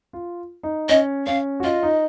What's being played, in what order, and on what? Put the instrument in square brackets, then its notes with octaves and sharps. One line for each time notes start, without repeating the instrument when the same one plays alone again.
[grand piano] F4
D#4
[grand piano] C#4 [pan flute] D#5
[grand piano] C#4 [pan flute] F5
[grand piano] F#4
[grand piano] F4 [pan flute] D#5
[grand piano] D#4